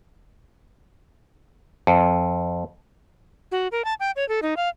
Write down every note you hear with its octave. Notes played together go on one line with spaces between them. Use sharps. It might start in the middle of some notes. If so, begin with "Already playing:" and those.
F2
F#4
A#4
A5
G5
C#5
A4
D#4
F5